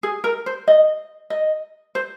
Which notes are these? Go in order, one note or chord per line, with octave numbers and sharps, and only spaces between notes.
G#4
A#4
C5
D#5
D#5
C5